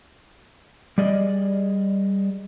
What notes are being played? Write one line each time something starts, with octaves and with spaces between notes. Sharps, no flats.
G3 G#4 D5 D#5